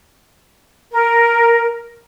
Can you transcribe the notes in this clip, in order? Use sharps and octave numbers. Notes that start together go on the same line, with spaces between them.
A#4